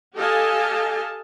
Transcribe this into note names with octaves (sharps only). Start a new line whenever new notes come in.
G4 A4 D#5 F5 G#5 A5